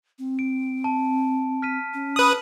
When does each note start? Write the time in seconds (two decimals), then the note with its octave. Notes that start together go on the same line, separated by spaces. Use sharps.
0.19 C4
0.39 D7
0.84 A5
1.62 F6 B6 D#7
1.94 C#4
2.16 B4 D#6 F#7